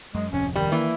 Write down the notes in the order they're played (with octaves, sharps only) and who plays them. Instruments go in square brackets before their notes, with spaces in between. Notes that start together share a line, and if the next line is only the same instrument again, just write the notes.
[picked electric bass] F#2 [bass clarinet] G#3
[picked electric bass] D1 F2 C3 [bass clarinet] C#4
[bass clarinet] D#3 [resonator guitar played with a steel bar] G3
[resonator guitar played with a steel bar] E3 [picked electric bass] A#3